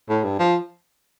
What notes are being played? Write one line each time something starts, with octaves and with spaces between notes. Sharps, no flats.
A2
G2
F3